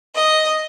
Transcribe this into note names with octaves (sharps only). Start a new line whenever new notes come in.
D#5